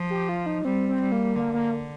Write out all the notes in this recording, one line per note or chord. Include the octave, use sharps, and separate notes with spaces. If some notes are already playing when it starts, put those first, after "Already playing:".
Already playing: F3
G4
F4
D#4
G3 C4
C4
G3
A#3
D3 A#3
A#3